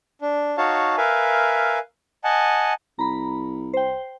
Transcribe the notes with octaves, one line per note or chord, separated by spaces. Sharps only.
D4
D#4 F#4 C#5 F5 A5
A#4 B4 E5 F5 G#5
D#5 F#5 G#5 A5
C2 A#5 B5
C5 G5